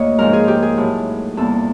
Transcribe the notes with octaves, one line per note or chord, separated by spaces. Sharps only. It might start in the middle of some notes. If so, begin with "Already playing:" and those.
Already playing: D2 A#3 C#5 D#5
G#2 F3 G#3 A#4
G#4
G4
G#4
A2 F#3 A3
E2 C3 E3 G3 A#3 A4